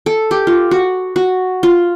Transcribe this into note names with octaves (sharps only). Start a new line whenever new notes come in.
A4
G4
F4
F#4
F#4
F4